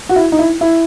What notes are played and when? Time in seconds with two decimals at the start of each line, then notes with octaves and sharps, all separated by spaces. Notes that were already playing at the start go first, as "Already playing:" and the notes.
0.09 F#4
0.16 E4
0.32 D#4
0.39 E4
0.61 E4